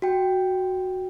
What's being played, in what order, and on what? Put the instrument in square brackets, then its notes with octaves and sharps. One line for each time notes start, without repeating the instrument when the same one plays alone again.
[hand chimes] F#4 G5